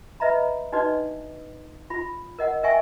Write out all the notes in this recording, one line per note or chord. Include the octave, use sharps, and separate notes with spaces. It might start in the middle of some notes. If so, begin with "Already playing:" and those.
B4 D#5 E5 A#5 B5
D4 D#4 F#4 B4 D5 D#5
F4 B5
A#4 D#5 F#5
A#4 D#5 E5 G5 G#5 C#6